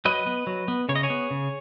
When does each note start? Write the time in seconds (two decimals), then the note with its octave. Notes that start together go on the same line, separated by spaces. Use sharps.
0.05 F#3 B4 D#5
0.26 B3
0.47 F#3
0.68 B3
0.89 C#3 C#5
0.96 D#5
1.03 G#4 C#5
1.10 B3
1.31 C#3